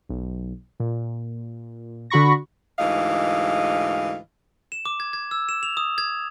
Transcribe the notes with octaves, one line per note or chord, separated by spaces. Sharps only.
B1
A#2
D3 F#4 B5 C#6 A#6
D2 G#2 E3 D#5 F5
E7
D6
G#6
G#6
E6
E7
F7
D#6
G#6